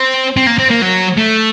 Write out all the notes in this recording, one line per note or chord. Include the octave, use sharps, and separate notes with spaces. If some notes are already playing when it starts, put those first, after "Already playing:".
Already playing: C4
C4
A#3
C4
A#3
F#3
A3